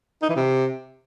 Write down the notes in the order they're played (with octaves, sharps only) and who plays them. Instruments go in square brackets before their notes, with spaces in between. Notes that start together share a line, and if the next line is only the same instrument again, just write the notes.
[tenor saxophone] D#4
E3
C3